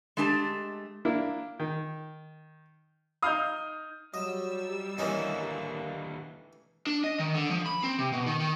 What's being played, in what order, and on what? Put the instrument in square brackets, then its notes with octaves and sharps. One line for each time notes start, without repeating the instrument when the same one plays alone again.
[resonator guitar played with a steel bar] G#3 A3 D4 G4 A5
[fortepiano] A#3 D4 E4
D#3
[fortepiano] D#4 F5 [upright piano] D#6 F6 G6
[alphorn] F#3 [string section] G3 E6 [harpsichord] D#5
[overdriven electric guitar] D#2 D3 [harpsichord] E3 C#4 D#4 [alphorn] A#3
[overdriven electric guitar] D4
D#5
D#3
D3
F3
B5
C4
C3
B2
D#3
D#3